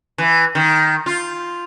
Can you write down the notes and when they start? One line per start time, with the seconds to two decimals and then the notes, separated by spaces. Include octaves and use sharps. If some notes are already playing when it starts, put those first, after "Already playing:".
0.18 E3
0.55 D#3
1.06 F4